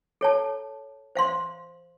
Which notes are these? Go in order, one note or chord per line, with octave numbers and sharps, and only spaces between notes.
A4 C#5 A5
C5 F5 C6